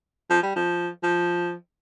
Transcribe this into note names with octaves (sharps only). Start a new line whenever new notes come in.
F3
G3
F3
F3